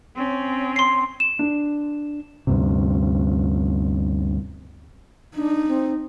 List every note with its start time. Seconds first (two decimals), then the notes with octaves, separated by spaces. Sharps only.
0.16 C4 C#4
0.76 C6 C7
1.20 E7
1.39 D4
2.47 D2 G2 C3
5.36 D4 D#4
5.68 C4